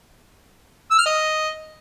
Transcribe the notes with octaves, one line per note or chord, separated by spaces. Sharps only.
E6
F6
D#5